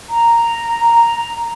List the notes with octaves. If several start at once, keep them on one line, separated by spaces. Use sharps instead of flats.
A#5